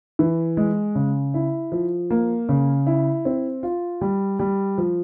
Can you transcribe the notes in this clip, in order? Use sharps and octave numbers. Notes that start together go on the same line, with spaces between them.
E3
G#3
C#3
E4
F3
A#3
C#3
E4
C4
F4
G3
G3
F3